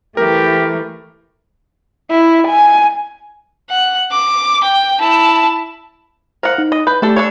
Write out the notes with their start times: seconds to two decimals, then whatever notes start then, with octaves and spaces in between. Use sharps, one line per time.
0.17 E3 A3 G4 A#4
2.11 E4
2.48 G#5
3.70 F#5
4.11 D6
4.63 G5
5.00 E4 A5
6.43 A#4 C5 F5 F#5
6.58 D#4
6.72 D#5
6.87 B4 G6
7.02 A3 D4 G4 A4
7.16 D4 A4 C#5